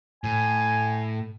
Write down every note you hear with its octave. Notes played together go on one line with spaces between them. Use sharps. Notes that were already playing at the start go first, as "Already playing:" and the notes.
A2 G#5